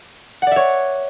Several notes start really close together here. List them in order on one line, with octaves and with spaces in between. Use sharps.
F#5 D5 E5 C#5